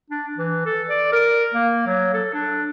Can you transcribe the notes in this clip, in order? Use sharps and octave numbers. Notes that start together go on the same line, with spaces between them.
D4
E3
A4
D5
A#4
A#3
F#3
A4
D4